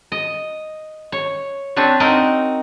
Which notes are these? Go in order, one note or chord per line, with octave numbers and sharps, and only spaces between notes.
D#5
C#5
C4 D4 B4 C#5
C4 D#4 F#4 A#4 D#5